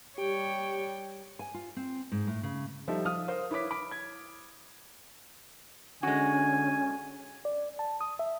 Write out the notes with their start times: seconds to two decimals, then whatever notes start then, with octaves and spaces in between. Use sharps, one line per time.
0.18 G3 G4 C#5 G5
1.39 G#5
1.54 F4
1.76 C4
2.12 G#2
2.27 A2
2.43 C#3
2.88 F3 G3 D#4 A4 E5
3.05 F3 F5 D#6 F6
3.28 A#4 C5 F5
3.51 E4 B4 C#5 D6 B6
3.71 B5 D6 D7
3.91 G#6
6.03 D3 G#3 C#4 F#4 G#5
7.45 D5
7.79 A5
8.01 D#6
8.19 E5